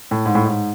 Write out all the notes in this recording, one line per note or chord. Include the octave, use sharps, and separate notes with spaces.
A2
G#2
A2
G#2